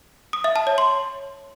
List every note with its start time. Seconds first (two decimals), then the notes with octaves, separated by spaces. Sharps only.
0.33 D#6
0.44 E5
0.56 A5
0.67 C#5
0.78 C6